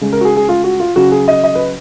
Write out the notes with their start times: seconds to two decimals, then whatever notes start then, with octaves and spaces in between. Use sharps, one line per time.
0.01 C#3 G#3
0.13 A#4
0.21 F#4
0.25 G#4
0.37 G#4
0.49 F4
0.64 F#4
0.80 F4
0.96 C#3 F#3 F#4
1.12 G#4
1.28 D#5
1.44 D#5
1.55 B4